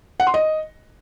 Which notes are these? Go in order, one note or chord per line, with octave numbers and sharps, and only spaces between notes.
F#5
C6
D#5